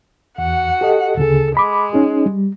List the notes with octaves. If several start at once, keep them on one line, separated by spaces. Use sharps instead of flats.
E2 F#4 F#5
G4 A4 D#5
D2 C#3 G#4 A4
G#3 B5 D6
C#4 D#4 G#4
G3